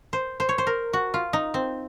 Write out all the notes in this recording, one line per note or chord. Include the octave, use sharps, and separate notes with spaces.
C5
C5
C#5
C5
A#4
F#4
F4
D#4
C4